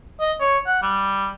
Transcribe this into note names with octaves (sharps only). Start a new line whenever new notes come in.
D#5
C#5
F#5
G3